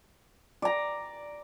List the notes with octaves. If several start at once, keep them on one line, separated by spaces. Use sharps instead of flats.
D5 A#5